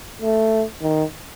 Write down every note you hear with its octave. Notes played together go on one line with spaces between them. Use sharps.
A3
D#3